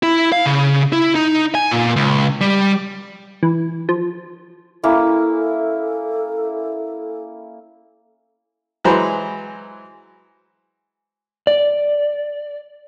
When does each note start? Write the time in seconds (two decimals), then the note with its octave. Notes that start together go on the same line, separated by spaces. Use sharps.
0.03 E4
0.32 F5
0.46 C#3
0.92 E4
1.15 D#4
1.55 G#5
1.71 A#2
1.96 C#2
2.41 G3
3.43 E3
3.89 F3
4.84 A#3 C#4 E4 A4
8.84 E3 F#3 G#3 C5 A#5 B5
11.47 D5